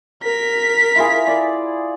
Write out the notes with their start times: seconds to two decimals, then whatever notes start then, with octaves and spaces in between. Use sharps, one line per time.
0.23 A#4 B6
0.96 E4 F4 G#4
1.27 D5